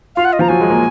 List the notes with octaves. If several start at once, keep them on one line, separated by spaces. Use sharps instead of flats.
F4 F5
F#5
D#5
F3 A#5
F#3 G#5
G#3
A#3